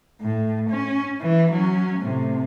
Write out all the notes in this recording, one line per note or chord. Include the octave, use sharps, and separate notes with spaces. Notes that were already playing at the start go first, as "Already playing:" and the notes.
A2
C#4
E3
F#3 C#4
A2 C3